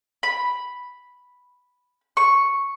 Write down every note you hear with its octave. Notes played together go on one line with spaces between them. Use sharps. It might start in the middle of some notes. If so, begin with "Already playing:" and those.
B5
C#6